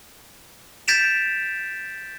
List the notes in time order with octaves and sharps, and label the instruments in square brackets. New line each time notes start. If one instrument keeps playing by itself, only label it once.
[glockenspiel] G6 A6 B6 D7 E7 F7